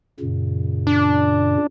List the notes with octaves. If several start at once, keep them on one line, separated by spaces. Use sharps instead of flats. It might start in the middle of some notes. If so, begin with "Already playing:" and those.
F#2 A#2 C#3
D4